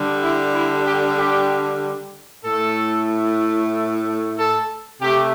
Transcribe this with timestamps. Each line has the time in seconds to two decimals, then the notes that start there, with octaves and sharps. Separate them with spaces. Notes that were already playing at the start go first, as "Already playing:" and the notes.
Already playing: D3 G3
0.21 E4
0.53 E4
0.85 G4
1.18 G4
2.45 A2 A3 A4
4.37 A4
5.01 C3 A3 G4